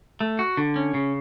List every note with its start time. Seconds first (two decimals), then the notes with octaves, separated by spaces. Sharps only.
0.21 A3
0.39 F#4
0.57 D3
0.76 C#4
0.94 C#3